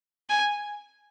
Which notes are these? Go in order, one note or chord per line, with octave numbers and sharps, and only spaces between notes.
G#5